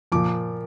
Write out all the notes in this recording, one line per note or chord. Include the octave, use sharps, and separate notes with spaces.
A#2 F3 D6